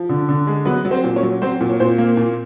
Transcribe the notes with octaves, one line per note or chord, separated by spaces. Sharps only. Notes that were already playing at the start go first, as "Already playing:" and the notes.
Already playing: F3
D3
D3
G#3
F#3 B3 B4
F#3
C4 C5
A#2
C#4 C#5
F#3
F#3 C4 C5
A#2
C#5
A#2 C4 C5
A#3
A#2